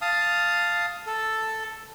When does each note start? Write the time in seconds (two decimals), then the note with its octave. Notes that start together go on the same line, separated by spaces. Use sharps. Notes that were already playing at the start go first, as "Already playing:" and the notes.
0.02 F5 A5 D#6
1.07 A4